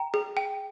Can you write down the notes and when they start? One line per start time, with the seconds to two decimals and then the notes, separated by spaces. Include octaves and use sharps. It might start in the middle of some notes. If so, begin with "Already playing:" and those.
Already playing: G5 A#5
0.14 G#4
0.37 G5